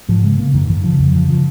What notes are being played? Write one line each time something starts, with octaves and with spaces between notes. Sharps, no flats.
G#2 F3
C#3 G#3
C#3 A#3
F#2 D#3
F#2 D#3
C#3 F3
F2 F#3
C#3 F3
F3